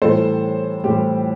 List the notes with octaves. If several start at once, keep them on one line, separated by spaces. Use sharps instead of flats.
A2 E3 G3 A4 C5
A2 E3 G3 G4